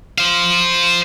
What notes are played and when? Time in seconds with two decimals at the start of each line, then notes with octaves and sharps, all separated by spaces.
0.18 C5 F5